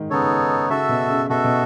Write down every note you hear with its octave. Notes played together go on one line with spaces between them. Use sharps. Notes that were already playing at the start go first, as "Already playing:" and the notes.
Already playing: G#2 D#3
C#3 B3 D#4 A4 C#5
C#3 F#4 A4 E5
B2
C#3
B2 F#4 A4 E5
B2